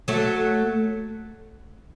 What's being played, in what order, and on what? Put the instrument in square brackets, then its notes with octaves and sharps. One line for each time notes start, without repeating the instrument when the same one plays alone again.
[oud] F#3 A3